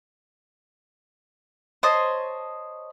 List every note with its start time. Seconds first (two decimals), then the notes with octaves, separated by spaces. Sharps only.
1.83 C5 C#5 D#5 A5